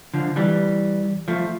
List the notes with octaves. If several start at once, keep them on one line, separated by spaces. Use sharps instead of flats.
D3 F3
E3 G3
F3 A3